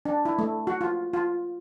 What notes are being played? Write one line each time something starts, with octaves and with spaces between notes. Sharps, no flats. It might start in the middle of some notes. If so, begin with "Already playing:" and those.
D4
E4
A3
F#4
F4
F4